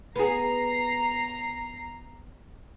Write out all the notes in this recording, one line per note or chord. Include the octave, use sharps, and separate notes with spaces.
B3 G#4 A#5 C7